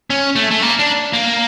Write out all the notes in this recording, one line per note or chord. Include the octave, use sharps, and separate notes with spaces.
C#4
A3
A3
A#3
D4
A#3